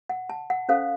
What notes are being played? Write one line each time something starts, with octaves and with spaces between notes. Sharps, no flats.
F#5
A5
F#5
C#4 A4 C5 F5